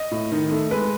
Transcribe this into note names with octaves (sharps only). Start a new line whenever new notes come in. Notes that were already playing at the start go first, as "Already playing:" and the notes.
Already playing: D#5
A2
D#3
A3
G#3 B4